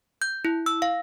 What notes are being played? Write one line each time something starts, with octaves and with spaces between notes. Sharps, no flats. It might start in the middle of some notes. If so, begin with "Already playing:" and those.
G6
E4
E6
F5